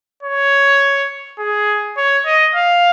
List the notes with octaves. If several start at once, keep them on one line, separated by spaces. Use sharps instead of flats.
C#5
G#4
C#5
D#5
F5